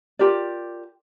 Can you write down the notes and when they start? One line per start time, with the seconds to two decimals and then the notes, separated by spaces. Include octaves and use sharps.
0.19 F4 G4 A#4 D5